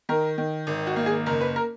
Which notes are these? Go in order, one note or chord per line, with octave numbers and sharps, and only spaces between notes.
D#3 A#4
D#3
G#1
F#4
A#3
G#4
F#1 A#4
B4
A#4